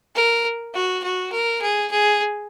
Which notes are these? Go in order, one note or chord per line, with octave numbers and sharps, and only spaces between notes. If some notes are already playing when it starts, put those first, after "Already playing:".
A#4
F#4
F#4
A#4
G#4
G#4